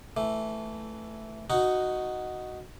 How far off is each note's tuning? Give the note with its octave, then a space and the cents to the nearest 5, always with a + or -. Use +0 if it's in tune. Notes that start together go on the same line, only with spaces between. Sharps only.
E3 +0 A3 +0
D#4 +0 F#4 +0